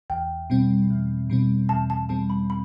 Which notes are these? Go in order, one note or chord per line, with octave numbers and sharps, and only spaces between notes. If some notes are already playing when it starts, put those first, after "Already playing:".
E2 G5
B2 G3 C4
E2
B2 G3 C4
E2 A5
A5
B2 G3 C4 A5
B5
B5